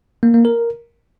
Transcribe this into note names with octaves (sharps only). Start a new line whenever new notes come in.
A#3
A#3
A#4